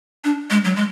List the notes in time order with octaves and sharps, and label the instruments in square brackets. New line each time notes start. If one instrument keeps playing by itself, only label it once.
[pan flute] D4
G#3
F#3
G#3